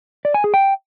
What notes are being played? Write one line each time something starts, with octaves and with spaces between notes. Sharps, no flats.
D5
G#5
G#4
G5